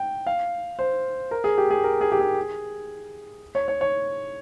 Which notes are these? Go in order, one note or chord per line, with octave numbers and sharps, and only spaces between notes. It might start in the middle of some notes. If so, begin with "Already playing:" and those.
Already playing: G5
F5
C5
A#4
G#4
G4
G#4
A#4
G#4
G4
G#4
C#5
C#5
C#5